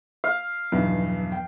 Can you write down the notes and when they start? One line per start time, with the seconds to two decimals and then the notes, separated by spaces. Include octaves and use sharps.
0.24 F5
0.72 B1 E2 G2 F3
1.32 G5